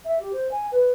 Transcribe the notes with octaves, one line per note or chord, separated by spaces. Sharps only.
E5
G4
C5
G#5
B4